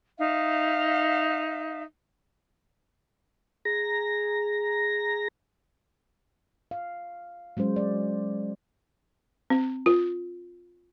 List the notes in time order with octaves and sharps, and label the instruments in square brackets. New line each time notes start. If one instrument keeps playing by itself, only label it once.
[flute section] D#4 E5 F5
[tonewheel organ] G#4 A#5 A#6
[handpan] F5
F#3 G#3 C#4 C5
D5
[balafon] C4
F4